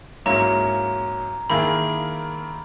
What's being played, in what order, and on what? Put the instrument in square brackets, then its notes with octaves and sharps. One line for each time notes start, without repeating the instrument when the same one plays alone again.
[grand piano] G#2 F#3 A#3 C#4 E4 [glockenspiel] A#5
[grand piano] D#3 A#3 E4 G#4 [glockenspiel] B5